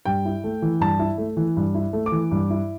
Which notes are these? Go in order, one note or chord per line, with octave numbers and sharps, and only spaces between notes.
G2 G5
E4
A3
E3
G2 A5
E4
A3
E3
G2
E4
A3
D6
E3
G2
E4